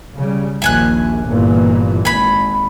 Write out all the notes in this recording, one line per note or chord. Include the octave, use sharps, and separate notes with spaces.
C#3 G3
A#1 D#2 E5 G#5 F#6
G1 A#2 E3
G#1 G#5 B5